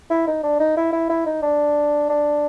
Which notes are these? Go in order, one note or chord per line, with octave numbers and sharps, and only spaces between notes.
E4
D#4
D4
D#4
E4
E4
E4
D#4
D4
D4